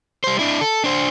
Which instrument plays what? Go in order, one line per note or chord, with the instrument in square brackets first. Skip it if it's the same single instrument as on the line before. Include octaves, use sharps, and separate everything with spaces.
[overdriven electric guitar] G3 C5
D4 E4
A4
D4 C5